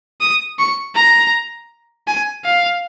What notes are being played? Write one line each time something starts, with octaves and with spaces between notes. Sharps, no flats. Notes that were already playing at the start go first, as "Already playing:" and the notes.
D#6
C#6
A#5
G#5
F5